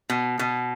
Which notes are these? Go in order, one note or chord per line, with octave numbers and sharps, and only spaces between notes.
B2
B2